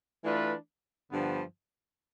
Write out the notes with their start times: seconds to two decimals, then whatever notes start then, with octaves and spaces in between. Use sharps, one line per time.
0.24 E3 A3 D4 F4 B4
1.11 G2 D3 F3 B3